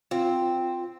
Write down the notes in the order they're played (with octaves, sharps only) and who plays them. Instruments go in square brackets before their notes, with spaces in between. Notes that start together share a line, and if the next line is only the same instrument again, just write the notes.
[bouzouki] C4 [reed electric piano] F4